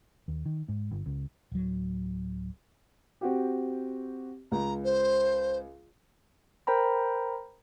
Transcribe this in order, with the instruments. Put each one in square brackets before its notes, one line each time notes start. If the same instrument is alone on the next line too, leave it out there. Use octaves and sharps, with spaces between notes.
[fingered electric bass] D#2
D#3
G#2
G1
C#2
[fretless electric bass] D1 F#3
[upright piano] C4 F#4 G4
[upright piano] C#2 [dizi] A#5
[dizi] C5
[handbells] A#4 C5 G5 A#5 B5